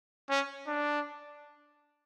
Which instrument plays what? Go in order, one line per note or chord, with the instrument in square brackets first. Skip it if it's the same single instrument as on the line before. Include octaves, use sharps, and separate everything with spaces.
[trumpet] C#4
D4